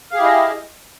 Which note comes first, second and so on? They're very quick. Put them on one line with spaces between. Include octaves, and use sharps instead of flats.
F5 G#4 G4 E4 D#5